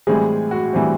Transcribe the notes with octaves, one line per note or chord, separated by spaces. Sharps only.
A2 E3 G3 G#3 C4 G#4
F#4
A2 E3 G3 C4